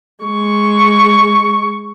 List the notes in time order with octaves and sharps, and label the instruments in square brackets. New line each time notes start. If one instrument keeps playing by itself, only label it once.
[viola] G#3 C#6